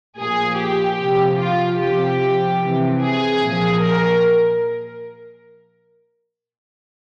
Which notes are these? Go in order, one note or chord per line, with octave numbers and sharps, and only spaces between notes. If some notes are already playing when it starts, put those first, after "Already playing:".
A#2 F3 G#4
G4
C3 F3
F4
C3 F3 G4
C3 E3
G#4
A#2 F3
A#4